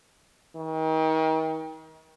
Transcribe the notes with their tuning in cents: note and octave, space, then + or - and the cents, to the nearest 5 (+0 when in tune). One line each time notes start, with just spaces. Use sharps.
D#3 +35